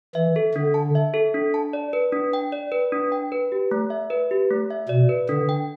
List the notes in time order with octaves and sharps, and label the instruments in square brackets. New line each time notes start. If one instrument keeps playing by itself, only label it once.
[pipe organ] E3 [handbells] E5
[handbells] A4
[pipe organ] D3 [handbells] D4
[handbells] A5
E5
A4
D4
A5
D5
B4
D4
G5
D5
B4
D4
G5
B4
G4
A3
E5
B4
G4
A3
E5
[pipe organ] B2 [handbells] D5
[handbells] B4
[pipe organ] D3 [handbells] D4
[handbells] G5